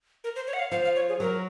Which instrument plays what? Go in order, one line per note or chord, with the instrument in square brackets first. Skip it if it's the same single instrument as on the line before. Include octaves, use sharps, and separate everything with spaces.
[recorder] A#4
C5
C#5
F#5
F5
[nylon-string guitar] F3 [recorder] F5
[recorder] F5
C#5
G#4
[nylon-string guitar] F#3 [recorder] A#4